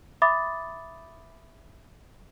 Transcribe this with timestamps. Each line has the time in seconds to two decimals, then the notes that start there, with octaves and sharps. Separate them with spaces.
0.22 E5 B5 D6 D#6 A6